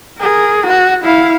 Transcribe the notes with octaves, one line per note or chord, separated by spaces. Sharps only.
G#4 A#4
F#4
E4 F5